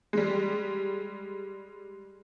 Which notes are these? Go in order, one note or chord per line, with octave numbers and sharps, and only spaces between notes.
G3 G#3